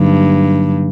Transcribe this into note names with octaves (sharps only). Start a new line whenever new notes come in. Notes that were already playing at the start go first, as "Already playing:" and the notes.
Already playing: G2 D3 F#3 A#3 D#4